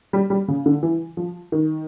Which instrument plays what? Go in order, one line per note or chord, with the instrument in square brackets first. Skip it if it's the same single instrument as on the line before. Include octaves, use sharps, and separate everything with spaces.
[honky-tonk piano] G3
G3
C#3
D3
E3
F3
D#3